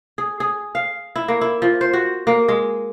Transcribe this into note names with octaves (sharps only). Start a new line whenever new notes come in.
G#4
G#4
F5
E4
A#3
E4
F3
C5
F#4
A#3
G#3